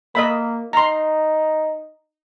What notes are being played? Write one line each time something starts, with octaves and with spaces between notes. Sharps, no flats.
A#3 D#5 E5 B5
D#4 A#5 C6